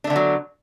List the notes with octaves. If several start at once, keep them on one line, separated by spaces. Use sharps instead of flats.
D3 F#3 A3 B3 D4